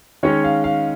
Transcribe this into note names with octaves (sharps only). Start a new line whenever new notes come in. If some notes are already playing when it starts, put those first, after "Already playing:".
D#3 G#3 C#4 C#5
F5
F5